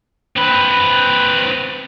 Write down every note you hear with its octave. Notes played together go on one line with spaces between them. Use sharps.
C4 B4